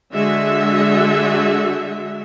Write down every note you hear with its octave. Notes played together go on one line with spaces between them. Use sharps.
D3 G#3 F#4 E5